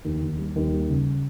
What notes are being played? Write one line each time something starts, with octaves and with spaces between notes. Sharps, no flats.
D#2
D#2
G3
D#2
G3
C#3